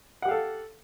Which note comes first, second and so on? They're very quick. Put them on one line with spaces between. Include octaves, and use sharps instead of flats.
F#5 G4 F5 A4